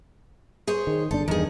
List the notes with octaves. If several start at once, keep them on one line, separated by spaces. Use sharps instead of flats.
G#4 C5 C#5
D#3
G1 D4 A4
E2 G2 D#3 G#4